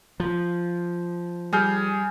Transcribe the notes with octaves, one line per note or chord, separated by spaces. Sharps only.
F3
G3 G#4 F6 G6